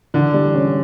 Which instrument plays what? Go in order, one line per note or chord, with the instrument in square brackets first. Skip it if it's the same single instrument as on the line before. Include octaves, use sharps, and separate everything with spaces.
[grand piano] D3 [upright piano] E3
[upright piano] G3
C#4